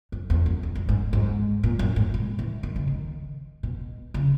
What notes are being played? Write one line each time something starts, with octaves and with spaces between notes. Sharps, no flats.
F#2
E2
F#2
E2
F#2
G#2
G#2
A#2
F#2
G#2
A#2
E3
D#3
C#3
D#3
B2
C#3